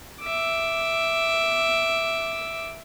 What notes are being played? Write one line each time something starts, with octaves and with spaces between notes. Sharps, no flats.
E5 D6